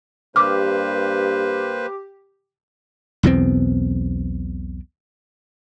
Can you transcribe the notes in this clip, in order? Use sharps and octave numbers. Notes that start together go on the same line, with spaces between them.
G2 A#3 G4 B4 C5 D6 F6
B1 E2 B2 C4